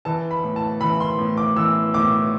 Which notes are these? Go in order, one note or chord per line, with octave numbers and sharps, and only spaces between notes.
E3 A5
B5
A2
A5
E3 B5
C6
A2
D6
E3 E6
A2 D6